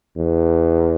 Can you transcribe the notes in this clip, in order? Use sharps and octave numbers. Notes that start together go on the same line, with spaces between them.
E2